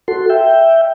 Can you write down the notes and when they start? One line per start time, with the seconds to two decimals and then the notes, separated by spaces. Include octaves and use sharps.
0.08 F#4 A4 C6
0.30 E5 G5